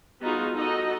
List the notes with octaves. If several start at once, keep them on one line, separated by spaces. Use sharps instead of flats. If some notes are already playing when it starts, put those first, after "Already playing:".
G3 B3 D#4 F4 F#4 G#4
D#4 F#4 A4 D#5